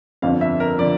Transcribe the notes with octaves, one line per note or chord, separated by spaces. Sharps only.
G1 F2 D3 F3 F5
E5
A#4
D3 F3 D5